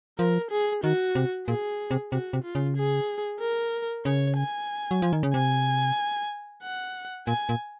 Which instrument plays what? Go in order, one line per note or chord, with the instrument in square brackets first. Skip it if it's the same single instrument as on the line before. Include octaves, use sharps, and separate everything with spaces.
[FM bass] F3 [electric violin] A#4
[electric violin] G#4
[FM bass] D#3 [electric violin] F#4
[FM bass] C3
[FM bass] A#2 [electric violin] G#4
[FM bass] C3
[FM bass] C3 [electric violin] F#4
[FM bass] C3
[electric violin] F4
[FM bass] C#3
[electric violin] G#4
A#4
[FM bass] C#3 [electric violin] C#5
[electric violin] G#5
[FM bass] F#3
F3
D#3
C#3
[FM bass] C3 [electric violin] G#5
[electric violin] F#5
[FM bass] A#2 [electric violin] G#5
[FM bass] A#2